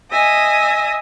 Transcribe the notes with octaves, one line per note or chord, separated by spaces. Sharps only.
D#5 E5 G#5 D#6